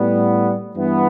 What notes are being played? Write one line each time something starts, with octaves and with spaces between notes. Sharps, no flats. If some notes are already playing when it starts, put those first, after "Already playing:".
Already playing: A2 G3 B3
G2 E3 B3